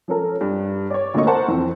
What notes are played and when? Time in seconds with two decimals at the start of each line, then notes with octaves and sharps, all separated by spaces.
0.08 F3 C#4 A4 A#4
0.41 G2
0.90 C#5 D5
1.14 D2 A#2 D3 A#3 D#5 C#6
1.27 A#4 C5 F#5 A5 C#6
1.48 F2 E3 C4